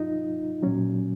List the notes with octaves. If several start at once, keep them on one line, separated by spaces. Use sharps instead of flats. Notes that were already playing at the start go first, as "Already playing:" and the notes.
Already playing: G#2 F#3 D#4 F4
A#2 F#3 C#4